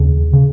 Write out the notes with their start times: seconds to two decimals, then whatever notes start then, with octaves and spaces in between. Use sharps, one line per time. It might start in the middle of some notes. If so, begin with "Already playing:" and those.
Already playing: D#2 C#3
0.33 C#3